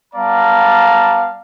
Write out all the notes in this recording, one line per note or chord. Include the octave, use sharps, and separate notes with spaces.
G3 B3 D5 F5 A5 A#5